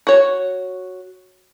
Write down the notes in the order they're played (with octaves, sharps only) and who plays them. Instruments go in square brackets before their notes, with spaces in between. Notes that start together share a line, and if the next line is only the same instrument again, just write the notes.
[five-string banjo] F#4 C#5